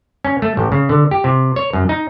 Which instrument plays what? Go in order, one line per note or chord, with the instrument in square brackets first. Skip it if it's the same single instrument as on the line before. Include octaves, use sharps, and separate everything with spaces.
[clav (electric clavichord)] C#4
A3
A1
C#3
D3
G4
C3
C#5
F#2
D#4